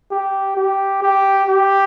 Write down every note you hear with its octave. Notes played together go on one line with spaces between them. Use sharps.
G4
G4
G4
G4